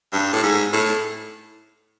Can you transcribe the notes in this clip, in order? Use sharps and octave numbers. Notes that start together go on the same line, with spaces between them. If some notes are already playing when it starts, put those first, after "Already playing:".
G2
A2
G#2
A2